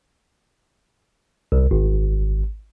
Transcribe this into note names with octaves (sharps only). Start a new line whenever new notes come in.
C2
G#1